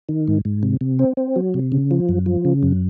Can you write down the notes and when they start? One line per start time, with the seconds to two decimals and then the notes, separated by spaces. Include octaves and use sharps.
0.09 D#3
0.28 G#2
0.45 G#2
0.63 C3
0.81 C3
0.99 C4
1.17 C4
1.36 F#3
1.54 C3
1.72 C#3
1.91 F3
2.09 F#2
2.26 F3
2.45 C#3
2.63 F#2